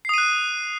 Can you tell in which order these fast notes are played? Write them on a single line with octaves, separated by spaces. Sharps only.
C7 D#6 D#7 F#6